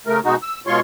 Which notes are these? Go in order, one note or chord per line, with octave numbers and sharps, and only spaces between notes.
C#3 A3 A#4
B2 G#3 D#4 F#4
E6
B2 G#3 F4 C#5 C6 C#6